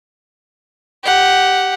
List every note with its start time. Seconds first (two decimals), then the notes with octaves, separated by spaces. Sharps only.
1.03 G4 F#5